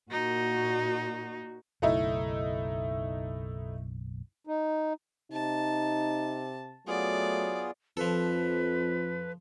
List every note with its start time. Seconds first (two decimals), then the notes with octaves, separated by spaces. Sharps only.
0.11 A#2 D#4 F#4
1.82 F#1 B1 A3 D#4 E4
4.47 D#4
5.32 C3 D#4 A5
6.87 F#3 A3 B3 F4 G#4 D5
7.97 F2 F3 A4 B4